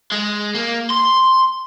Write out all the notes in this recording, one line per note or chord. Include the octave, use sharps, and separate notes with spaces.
G#3
A#3
C6